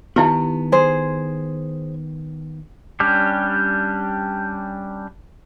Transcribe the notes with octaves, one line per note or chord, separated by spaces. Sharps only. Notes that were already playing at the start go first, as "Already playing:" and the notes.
D#3 B3 D#4 E4 G4
G#4 C5
G3 C#4 D4 G4